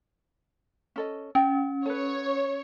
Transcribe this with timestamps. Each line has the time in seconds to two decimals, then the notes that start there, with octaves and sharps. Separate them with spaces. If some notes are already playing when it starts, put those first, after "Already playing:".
0.96 C#4 A4 D#5
1.35 C#4 G5
1.86 A4 B4 C#5